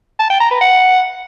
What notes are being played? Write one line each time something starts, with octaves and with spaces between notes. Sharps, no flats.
A5
G5
A#5
B4
F#5